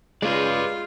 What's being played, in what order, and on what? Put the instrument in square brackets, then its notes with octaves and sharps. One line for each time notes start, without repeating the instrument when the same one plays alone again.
[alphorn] C#3 [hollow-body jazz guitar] G#3 [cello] F4 [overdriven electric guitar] B4 D5